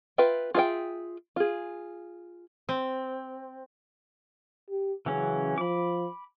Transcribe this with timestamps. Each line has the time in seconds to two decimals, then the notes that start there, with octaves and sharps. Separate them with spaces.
0.18 F4 B4 E5 G5
0.54 F4 G#4 C5 E5 G5
1.36 F4 G#4
2.69 C4
4.70 G4
5.06 C#3 E3 F#3 C#4
5.58 F3 B5 D6